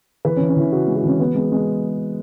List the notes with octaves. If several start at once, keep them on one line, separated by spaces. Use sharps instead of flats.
E3 B4
C#4
E3
C#4
E3 E4
C#3 F#4
G#3
F#4
E3 C#4
E3 B3
G#3
G#3